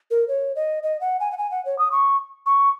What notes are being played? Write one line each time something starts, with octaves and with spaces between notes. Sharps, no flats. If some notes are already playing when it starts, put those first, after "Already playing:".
A#4
C#5
D#5
D#5
F#5
G#5
F#5
G#5
F#5
C#5
D#6
C#6
C#6